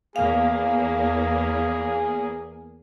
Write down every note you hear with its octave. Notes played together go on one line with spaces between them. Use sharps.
E2 A#3 G#4 F5